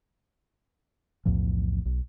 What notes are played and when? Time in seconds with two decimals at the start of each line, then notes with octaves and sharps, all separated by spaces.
1.25 B1 E2 A2 F3
1.85 B1